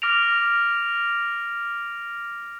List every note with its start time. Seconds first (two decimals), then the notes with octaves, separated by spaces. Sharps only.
0.02 D6 F6 A#6 D7 F7